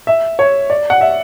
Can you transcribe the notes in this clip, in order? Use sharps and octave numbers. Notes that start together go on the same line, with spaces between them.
E5
C#5
D5
F#5
E5